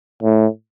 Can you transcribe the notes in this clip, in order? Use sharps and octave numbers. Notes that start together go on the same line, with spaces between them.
A2